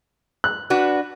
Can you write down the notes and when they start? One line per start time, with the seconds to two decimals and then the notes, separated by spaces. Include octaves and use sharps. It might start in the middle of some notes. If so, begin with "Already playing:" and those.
0.44 F#6
0.70 D4 F#4 B4